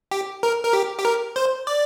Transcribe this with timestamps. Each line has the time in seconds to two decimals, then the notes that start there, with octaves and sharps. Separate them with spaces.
0.11 G4
0.43 A#4
0.64 A#4
0.73 G4
0.99 G4
1.05 A#4
1.36 C5
1.67 D5